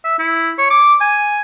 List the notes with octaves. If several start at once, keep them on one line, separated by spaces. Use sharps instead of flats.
E5
E4
C#5
D6
G#5